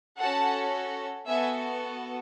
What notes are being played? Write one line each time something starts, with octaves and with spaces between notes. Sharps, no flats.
C#4 F#4 A4 F#5 A5
B3 F#4 A4 E5 G#5